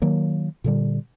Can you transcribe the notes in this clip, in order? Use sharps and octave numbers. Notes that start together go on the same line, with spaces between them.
D#3 F#3 A#3
A#2 D3 G3